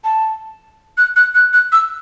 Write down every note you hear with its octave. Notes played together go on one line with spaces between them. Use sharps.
A5
F#6
F#6
F#6
F#6
E6